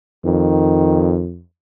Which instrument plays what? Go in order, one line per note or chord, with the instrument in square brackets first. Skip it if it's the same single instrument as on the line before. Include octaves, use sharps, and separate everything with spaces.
[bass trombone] F2 [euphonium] D#3